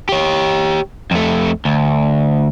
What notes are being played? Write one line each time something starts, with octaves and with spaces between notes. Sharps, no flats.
G4 C#5
F2 A3
D2